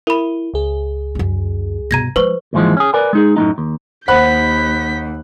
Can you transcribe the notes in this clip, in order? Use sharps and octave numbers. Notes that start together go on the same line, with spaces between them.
E4 A#4 B5
C#2 G#4
F#2 D3
G2 B2 A#5 G#6 A#6
F3 G#3 B4 C5 C#6
D#2 G#2 E3 F3 G#3
C#4 G#4
A#4 B4 D5 G#5
G#3 D#4 G#4
F#2 A2 G#3 D#4
D#2
D#2 C5 F#5 B5 F#6 G6 B6